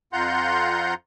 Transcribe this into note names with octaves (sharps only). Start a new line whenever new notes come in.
F2 F4 F#5 A#5 C6 G6